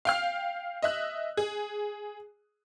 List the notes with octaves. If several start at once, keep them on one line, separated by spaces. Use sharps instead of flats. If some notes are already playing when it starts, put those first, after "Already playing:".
F5 G5 F6
D#5 E5 F#6
G#4